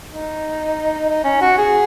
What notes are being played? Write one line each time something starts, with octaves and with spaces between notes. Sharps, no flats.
D#4
D#4
C#4
F#4
G#4